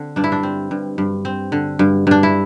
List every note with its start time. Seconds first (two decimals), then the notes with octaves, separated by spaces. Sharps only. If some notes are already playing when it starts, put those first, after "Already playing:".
Already playing: D3 C4
0.16 G2 D4
0.24 E4
0.32 D4
0.43 C4
0.71 G2
0.98 G2
1.25 C4
1.52 D3
1.79 G2
2.07 G2 D4
2.23 E4